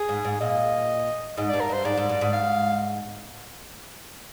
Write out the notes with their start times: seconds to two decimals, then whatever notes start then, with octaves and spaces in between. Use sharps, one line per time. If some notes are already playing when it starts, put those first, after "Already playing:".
Already playing: G#4
0.09 G#2
0.25 G#2
0.40 A#2 D#5
1.37 G#2 D#5
1.49 G2 D5
1.61 A#4
1.69 G2 C5
1.85 G#2 D5
1.97 G#2
2.09 G2
2.21 G#2
2.33 F5